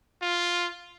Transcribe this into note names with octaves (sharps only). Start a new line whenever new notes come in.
F4